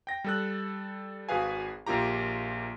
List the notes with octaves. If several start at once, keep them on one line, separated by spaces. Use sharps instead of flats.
G5 A#6
G3 A4 F#6
G#1 F#4 G#4 B4 F5 G#5
A#1 A#3 F4 G4 A#5